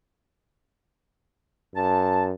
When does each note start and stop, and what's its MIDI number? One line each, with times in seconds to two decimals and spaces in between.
1.75 2.33 42
1.75 2.24 81